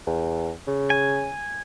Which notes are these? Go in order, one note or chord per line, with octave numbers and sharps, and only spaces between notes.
E2
C#3
G#5